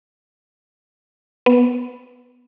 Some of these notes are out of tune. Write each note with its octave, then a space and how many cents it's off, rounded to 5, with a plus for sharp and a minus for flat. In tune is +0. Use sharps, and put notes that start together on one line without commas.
B3 -5